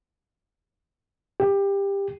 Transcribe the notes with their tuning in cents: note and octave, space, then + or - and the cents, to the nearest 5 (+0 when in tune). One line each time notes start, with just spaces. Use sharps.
G4 +20